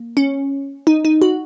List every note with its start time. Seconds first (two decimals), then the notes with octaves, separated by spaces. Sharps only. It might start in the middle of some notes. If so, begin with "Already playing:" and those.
Already playing: A#3
0.17 C#4
0.87 D#4
1.05 D#4
1.22 F#4